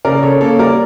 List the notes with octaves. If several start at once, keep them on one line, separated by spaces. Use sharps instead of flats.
C#3 A#4 D5
C#3 A4 C#5
A#3 A4 C#5
G3 A#4 D5